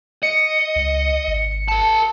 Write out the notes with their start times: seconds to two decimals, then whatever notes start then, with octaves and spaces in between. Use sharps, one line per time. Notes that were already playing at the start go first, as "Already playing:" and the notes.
0.23 D#5 C#7
0.76 C#2
1.27 G#1
1.68 A#4 A5